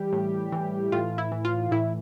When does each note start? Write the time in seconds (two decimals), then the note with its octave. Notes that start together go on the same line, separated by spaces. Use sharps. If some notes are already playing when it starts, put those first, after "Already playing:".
Already playing: E3 G3 G4
0.13 A2
0.52 E3
0.92 A2 F4
1.18 E4
1.32 E3
1.45 F4
1.71 A2 E4